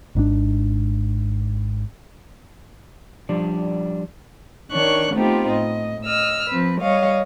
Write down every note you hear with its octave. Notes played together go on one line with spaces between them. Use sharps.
G#1 G#2 D#3 D4
F3 G3 D4 D5
D#3 D4 C#5 C#6 F#6
A3 B3 C4 D#4 F4 G4
A2 D#5
D#5 E6 F6
F3 C4 B4
G3 C#5 D#5 F5